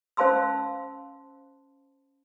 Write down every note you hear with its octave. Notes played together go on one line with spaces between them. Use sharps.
C#4 C5 F5 A5 C6 E6